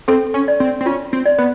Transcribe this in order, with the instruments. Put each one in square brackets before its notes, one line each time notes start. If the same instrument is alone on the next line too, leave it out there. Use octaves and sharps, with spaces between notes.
[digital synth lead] C4 [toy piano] A4
[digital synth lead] C#4
[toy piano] D5
[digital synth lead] C4
C4
[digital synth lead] C#4 [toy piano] F4
[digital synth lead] C4
[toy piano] D5
[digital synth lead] B3